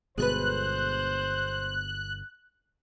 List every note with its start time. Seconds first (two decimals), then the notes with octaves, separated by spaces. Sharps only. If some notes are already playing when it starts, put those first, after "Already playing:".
0.18 G1 B2 G#3 G#4 A4 B4 C5 F#6